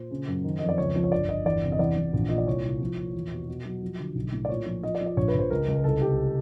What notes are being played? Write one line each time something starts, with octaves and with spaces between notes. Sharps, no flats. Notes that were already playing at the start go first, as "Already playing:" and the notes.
Already playing: A#2 C5
C#3
F#2
D#3
F2 D#5
D5
C#2 C#5
F3
C#5
G1 D5
G1 D#5
E2 D5
C3
D#5
E2 D5
E2
A#1
A#2 D#5
D5
C2 C#5
C2
F3
A#2
E2
B2
B2
F#3
F3
D3
B1
A2
D5
A#2 C#5
F3
F3 D#5
D5
F3
D5
A#1 C#5
B4
A#1 C5
C#2 A#4
C#2
C2 A4
C2 G4